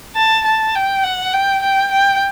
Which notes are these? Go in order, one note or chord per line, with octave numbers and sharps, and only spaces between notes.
A5
A5
G5
F#5
G5
G5
G5